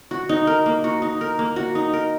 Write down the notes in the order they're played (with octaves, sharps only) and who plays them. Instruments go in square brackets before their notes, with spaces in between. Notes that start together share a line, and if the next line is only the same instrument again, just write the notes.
[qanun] F#4
D#4
A#4
A#3
F#4
D#4
A#4
A#3
F#4
D#4
A#4